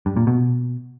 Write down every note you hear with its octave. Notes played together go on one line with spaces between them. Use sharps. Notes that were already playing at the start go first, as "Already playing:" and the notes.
G2
A#2
B2